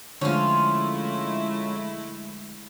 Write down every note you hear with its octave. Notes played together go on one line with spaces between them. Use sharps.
D3 F3 G#3 A3 C#4 E4 F4